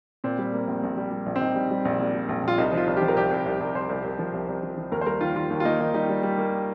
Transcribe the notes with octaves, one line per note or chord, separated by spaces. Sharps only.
A#2 C4
G3
A#3
A#1
A#1
G3
G3
A#1
C4
A#1 D#4
G3
G3
A#1
A#2
G3
A#1
A#1 F4
C2 D#4
F3 F4
C2
G4
F3
A#4
C2 G4
C2
C2
C2
C2 C5
C2
C2
F3
C2
C2
F3
F3
D#2 A#4
C5
G3 A#4
D#3 F4
D#3 F4
D#2
F4
A#3 D#4
D#3 D#4
G3 D#4
G3
G3
A#3